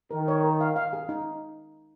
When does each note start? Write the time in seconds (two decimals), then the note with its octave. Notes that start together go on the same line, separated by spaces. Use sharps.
0.11 D#3 A#4
0.28 C#5
0.44 A#4
0.61 F5
0.76 F5
0.93 G#4
1.09 D#4